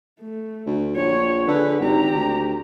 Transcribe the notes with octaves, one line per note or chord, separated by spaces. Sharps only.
A3
D2
A#1 C#5
D3 G#4 B4
G#1 G4 A#5
D2